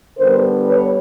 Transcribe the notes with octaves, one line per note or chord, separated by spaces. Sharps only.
D3 G3 B3 D4 A#4 C5
B4 C#5